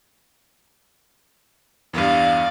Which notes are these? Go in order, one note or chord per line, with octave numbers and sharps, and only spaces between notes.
E2 G2 D5 F5